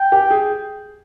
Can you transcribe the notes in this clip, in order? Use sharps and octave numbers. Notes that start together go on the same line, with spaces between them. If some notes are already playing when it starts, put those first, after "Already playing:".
Already playing: G5
G4
G#4